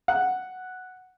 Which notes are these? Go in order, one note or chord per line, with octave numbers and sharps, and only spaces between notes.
F#5